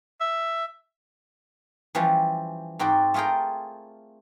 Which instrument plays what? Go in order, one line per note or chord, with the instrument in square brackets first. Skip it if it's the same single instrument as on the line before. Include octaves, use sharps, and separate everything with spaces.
[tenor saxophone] E5
[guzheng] E3 F3 G3 C#4
G#2 C4 F#4 D5
A3 F4 G#4 A#4 G5